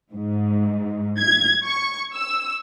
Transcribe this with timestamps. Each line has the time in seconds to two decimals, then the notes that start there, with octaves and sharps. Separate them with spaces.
0.13 G#2
1.19 G#6
1.64 C#6
2.14 E6